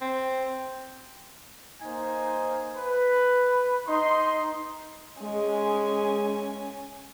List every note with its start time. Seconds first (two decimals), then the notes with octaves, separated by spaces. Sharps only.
0.01 C4
1.82 A#3 D#4 C5 G#5
2.75 B4
3.88 D#4 C6
5.22 G#3 C#4 G#5